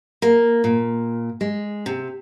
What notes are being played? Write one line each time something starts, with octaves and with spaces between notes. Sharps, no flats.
A#3
A#2
G#3
C3